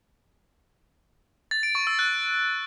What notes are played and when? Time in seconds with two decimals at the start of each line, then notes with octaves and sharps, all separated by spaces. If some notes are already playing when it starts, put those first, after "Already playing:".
1.51 A6
1.63 D7
1.75 C#6
1.87 E6
1.99 F#6